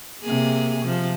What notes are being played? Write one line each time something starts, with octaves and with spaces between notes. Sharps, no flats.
C3 A#3 G#4
C3 F3